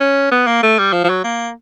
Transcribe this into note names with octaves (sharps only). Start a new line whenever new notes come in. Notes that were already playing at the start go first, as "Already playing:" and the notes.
C#4
B3
A#3
A3
G3
F3
F3
F#3
A#3